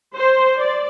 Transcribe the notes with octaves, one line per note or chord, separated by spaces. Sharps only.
C5
D5